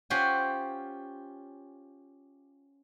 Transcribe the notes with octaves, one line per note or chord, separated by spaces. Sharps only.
C#4 F4 G4 C5 F#5 G#5